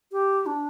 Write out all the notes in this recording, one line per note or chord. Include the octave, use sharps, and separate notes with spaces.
G4
D4